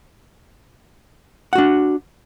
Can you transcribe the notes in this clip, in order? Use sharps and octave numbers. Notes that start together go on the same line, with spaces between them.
D4 F#4 F#5